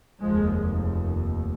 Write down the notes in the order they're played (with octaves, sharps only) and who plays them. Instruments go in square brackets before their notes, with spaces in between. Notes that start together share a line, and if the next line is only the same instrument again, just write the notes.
[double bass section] F1 D#2 F3 G#3